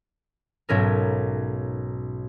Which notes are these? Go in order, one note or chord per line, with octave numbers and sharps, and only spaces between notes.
B1 G#2 C#4 A4 A#4